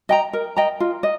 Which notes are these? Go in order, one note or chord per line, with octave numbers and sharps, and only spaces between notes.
D#5 G5 A#5
A#4
D#5 G5 A#5
F4
D#5